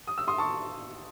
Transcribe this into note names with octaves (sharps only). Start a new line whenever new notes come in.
D#6
E6
C6 D#6
A5 C#6